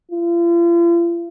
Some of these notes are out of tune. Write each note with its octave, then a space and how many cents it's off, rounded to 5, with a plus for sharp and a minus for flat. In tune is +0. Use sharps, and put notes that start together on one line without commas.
F4 -40